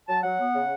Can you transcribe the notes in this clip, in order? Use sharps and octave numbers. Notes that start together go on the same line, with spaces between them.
F#3 A5
F#3 F#5
B3
C#3